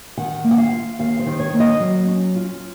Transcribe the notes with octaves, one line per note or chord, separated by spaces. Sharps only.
D#3 F#5
A#3
F#5
F5
F4
D#2 F5
C5
D#3
C#5
A#3
D#5
F#3
C#4
F4